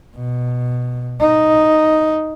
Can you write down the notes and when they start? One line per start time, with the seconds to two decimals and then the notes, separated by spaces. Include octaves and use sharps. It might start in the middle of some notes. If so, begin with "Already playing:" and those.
0.17 B2
1.20 D#4